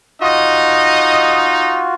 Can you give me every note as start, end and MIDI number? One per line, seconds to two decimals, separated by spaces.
0.21 1.90 63
0.21 1.95 65
0.21 1.95 66
0.21 1.50 75